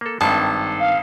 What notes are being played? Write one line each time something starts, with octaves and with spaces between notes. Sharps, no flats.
A#3 A4
G#1 G2 D#3 A5
F5